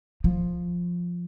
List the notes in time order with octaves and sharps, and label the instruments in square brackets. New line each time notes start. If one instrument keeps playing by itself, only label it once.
[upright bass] F3